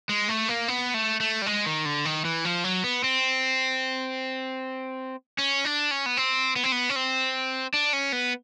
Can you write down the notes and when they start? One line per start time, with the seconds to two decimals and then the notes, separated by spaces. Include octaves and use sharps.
0.09 G#3
0.29 A3
0.48 A#3
0.68 B3
0.94 A3
1.20 A3
1.42 G3
1.46 G#3
1.66 D#3
1.85 D3
2.05 D#3
2.25 E3
2.45 F3
2.64 F#3
2.84 B3
3.04 C4
5.38 C#4
5.65 D4
5.91 C#4
6.06 B3
6.17 C4
6.56 B3
6.64 C4
6.72 B3
6.89 C#4
6.96 C4
7.74 D4
7.93 C#4
8.12 B3